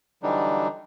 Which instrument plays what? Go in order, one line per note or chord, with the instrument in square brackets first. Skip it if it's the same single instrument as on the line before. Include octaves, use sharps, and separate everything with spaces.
[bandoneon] D3 E3 F#3 G3 D4 D#4